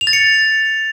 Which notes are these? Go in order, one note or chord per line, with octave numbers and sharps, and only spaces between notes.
F7
A6
C#7